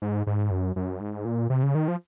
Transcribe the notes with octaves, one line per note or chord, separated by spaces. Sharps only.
G#2
G#2
F#2
F#2
G#2
A#2
C3
C#3
D#3
F3